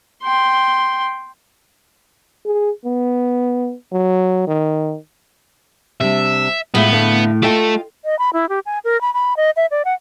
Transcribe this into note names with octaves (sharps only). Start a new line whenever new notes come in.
G5 C6
G#4
B3
F#3
D#3
C3 G3 D4 E5
A2 G#3 B3 F4 E5
D3 A3 F5
A3 F4 A4 D#5 G5
D#5
B5
E4
G4
G#5
A#4
B5
B5
D#5
E5
D5
F#5